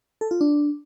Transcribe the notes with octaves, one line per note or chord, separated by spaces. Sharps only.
A4
F4
D4